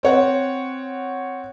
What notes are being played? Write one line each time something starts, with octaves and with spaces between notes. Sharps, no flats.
C4 C#5 F#5